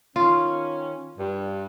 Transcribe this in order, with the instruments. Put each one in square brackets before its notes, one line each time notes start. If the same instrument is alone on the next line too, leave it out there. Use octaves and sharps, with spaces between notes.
[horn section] D#3 C#4 [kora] F4
[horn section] G2